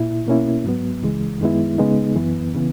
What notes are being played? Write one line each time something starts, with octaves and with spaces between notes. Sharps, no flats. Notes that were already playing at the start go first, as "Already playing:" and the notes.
Already playing: A#2 E4
B2 A#3 C#4 E4
G#2 F#3 B3
C#2 C#3 E3 G#3
F#2 D#3 G#3 B3 E4
C#3 G#3 B3 D#4
F#2 E3 B3
C#3 E3 B3